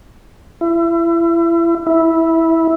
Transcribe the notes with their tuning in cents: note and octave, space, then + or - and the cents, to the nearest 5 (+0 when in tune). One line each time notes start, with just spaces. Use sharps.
E4 +30
E4 -10